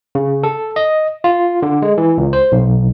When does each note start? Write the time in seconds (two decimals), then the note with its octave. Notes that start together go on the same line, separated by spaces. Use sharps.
0.15 C#3
0.44 A4
0.76 D#5
1.24 F4
1.62 D3
1.82 G#3
1.98 E3
2.18 C#2
2.33 C5
2.52 B1